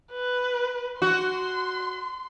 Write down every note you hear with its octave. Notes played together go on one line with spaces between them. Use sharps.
B4
F#4 C6